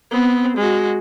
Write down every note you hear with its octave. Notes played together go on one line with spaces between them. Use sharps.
B3 C4
G#3 F#4